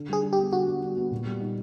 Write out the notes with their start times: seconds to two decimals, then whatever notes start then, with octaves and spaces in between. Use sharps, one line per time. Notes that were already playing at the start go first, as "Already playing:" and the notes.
Already playing: D3
0.09 G3 G#4
0.22 D4
0.33 G4
0.38 B3
0.53 D3 F#4
0.67 G3
0.83 D4
0.97 B3
1.11 A#2
1.26 G3
1.40 D#4